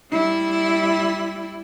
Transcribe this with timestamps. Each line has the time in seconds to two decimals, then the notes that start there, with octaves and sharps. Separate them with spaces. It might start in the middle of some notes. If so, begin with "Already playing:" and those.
0.11 G3 E4